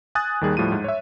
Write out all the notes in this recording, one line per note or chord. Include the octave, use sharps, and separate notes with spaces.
G#5 D#6 F#6 A6
D#2 D#3 G3 G#4
A2 F3 G3 D#7
G#2
C#5 E5